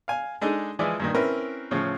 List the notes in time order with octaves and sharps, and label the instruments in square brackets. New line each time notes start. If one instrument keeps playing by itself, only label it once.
[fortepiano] F5 G#5
G#3 D4 D#4 G#4 A4
E3 F3 G#3 G#4 D5 E5
G2 A#2 D#3
C4 C#4 E4 A#4 B4
A2 C#3 F3